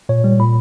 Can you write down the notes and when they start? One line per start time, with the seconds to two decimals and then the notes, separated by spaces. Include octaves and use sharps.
0.09 A#2 C#5
0.24 G3
0.39 A#2 B5